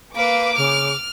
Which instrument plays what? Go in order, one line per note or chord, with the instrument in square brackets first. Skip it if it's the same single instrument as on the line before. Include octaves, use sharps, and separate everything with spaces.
[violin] A#3 B4 [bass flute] F5 [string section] D6
[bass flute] C#3 [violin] F6